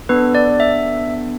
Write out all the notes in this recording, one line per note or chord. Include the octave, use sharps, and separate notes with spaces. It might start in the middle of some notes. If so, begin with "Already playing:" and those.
B3 D4 A4 B4
D5
E5